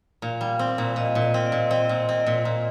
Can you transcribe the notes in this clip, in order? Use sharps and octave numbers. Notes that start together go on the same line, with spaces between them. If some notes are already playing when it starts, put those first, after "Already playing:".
A#2 F5
G3
C4
A#2
A#2 D#5
A#2
D#5
C4
D5
A#2
C4 D#5
A#2
C4
D5
A#2
A#2